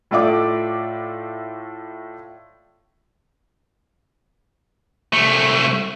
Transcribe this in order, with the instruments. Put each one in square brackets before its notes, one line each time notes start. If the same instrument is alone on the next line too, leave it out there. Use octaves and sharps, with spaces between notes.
[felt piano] A2 A3 F4 D5 E5 D6
[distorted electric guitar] C2 A3